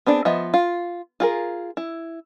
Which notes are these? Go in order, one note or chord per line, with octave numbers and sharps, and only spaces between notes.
B3 C4 D4 G#4
F3 B3 D#5 E5
F4
F4 G#4 A#4
E4